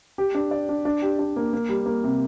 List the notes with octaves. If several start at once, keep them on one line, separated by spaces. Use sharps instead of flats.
G4
D4
D5
D4
D4
G4
D4
A#3
A#3
G3
A#3
C3